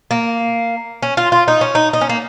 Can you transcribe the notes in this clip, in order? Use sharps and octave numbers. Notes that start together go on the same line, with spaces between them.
A#3
C#4
F4
F4
D#4
C#4
D#4
D#4
C#4
A#3